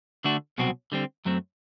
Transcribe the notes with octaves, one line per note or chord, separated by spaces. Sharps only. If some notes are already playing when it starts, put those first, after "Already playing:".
D3 A3 D4 F#4
C2 B2 F#3 C4 F#4
D3 G3 C4
F#2 F#3 A3 C4